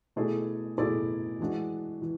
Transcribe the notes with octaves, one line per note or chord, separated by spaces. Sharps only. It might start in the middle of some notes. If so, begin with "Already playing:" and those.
B2 A3 E4 G#4 D5
B2 A3 E4 G#4 D5
E3 G#3 D4 F#4
E3